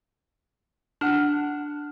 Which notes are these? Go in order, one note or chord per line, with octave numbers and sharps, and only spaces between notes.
D4 F#5 F6